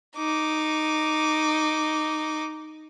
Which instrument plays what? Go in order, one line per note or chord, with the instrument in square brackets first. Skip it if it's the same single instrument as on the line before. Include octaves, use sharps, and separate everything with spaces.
[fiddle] D#4 D6